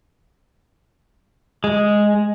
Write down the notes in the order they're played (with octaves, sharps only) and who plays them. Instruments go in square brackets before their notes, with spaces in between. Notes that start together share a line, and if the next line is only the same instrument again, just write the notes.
[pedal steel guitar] G#3